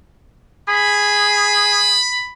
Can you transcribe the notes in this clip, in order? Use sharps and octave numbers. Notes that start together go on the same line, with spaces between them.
G#4 B5